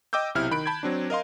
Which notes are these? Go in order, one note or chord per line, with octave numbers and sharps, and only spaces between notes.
D#5 G5 D6 E6 G6
B1 C3 E4 F6
D#3 B5 F#6 D7
A5 B5 G6 G#6
F#3 C4 D4
A#4 D#5 F5 C6